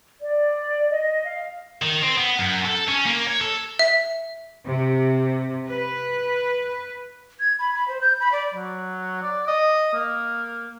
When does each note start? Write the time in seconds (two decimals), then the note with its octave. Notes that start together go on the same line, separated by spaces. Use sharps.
0.20 D5
0.90 D#5
1.25 F5
1.82 D#3
2.03 C4
2.18 B3
2.39 F#2
2.65 A4
2.88 C#4
3.06 A#3
3.27 C#5
3.41 A4
3.79 E5
4.65 C3
5.68 B4
7.40 G#6
7.59 B5
7.75 B5
7.88 C5
8.01 G6
8.20 B5
8.32 D5
8.53 F#3
9.22 D5
9.47 D#5
9.94 A#3